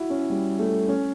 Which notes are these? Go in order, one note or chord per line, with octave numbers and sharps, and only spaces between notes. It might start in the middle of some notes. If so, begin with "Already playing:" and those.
Already playing: E4 F#4
C#4
G3
A3
C#4